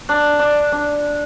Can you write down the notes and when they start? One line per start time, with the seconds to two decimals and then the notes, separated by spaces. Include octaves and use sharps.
0.09 D4
0.39 D4
0.72 D4